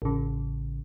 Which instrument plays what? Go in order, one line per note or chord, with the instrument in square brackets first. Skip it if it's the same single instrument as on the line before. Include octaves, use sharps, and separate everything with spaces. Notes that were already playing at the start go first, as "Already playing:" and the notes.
[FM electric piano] A1 C#3